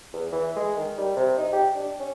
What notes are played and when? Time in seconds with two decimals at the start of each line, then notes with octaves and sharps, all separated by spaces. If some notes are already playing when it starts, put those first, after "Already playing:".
0.13 E2
0.32 E3
0.56 G#3
0.77 D#3
0.98 G3
1.16 C3
1.38 D#4
1.53 G4
1.75 D4
2.00 C#4